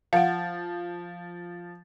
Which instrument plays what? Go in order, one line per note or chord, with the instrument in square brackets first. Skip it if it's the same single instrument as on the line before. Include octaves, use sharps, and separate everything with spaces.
[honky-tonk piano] F3 [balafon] F5 F#5